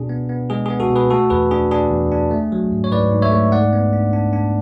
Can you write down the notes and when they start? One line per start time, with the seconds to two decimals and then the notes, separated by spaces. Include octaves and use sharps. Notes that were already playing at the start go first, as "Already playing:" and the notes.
Already playing: B2 D4 G#4
0.09 B3
0.29 B3
0.50 G#3 G#4
0.66 B3 G#4
0.80 F#4 A4
0.90 B2
0.96 G#4 B4
1.10 A3 F#4 A4
1.30 E2 G#4 B4
1.51 D4 G#4
1.71 D4 G#4
1.91 E2
2.12 D4
2.31 A3
2.52 F#3
2.72 G#2
2.84 C#5
2.92 G#2 B4 D5
3.12 G#2
3.22 C#5 E5
3.32 A3
3.52 G#2 D5 F#5
3.73 B3
3.93 D4
4.13 D4
4.33 D4